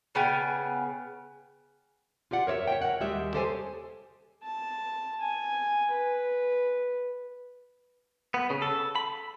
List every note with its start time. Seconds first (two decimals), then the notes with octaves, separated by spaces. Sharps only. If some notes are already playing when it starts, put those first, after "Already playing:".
0.15 C#3 B3 G5 G#5
2.31 F4 G4 D5 F#5
2.47 A#4 C#5 D5 E5
2.67 C#5 E5 G5
2.82 A#4 F#5
3.00 D#2 G3 G#3 G4 E5
3.34 G4 A4 C5 C#5 G#5
4.43 A5
5.21 G#5
5.91 B4
8.34 B3
8.50 C#3
8.62 A4
8.96 B5